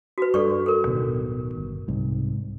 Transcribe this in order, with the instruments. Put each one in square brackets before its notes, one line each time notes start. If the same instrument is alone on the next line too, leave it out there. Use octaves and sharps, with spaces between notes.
[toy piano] F#4 B4
[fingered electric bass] G2 [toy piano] A4 D5 C#6
[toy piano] A4 A#4
[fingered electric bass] D1 B2 D#3
G1
C2 G#2